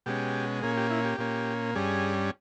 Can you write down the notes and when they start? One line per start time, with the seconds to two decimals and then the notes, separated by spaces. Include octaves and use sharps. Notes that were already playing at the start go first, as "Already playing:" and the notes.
0.06 B2 G#3 C#4 G4
0.63 A#2 A#3 C#4 G#4
0.77 G4
0.90 E4
1.05 G4
1.18 A#2 A#3 C#4
1.75 G2 G3 C#4 G#4